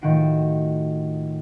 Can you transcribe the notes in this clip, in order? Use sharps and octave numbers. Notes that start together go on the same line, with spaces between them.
A2 D#3 F3 F#4 C7 D7